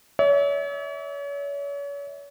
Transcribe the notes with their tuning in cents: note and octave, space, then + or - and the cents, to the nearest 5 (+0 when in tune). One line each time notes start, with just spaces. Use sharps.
C#5 +40 E5 -35